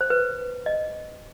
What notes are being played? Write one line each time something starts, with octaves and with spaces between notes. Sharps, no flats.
C5
B4
D#5